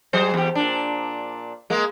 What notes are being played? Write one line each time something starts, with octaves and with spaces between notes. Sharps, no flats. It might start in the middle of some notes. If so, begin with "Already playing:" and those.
F#3 G#4 C5
E2 G4
A#2 D4
G#3 A#3